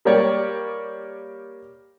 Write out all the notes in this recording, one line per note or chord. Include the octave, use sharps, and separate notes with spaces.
G3 A#3 G4 C#5 D5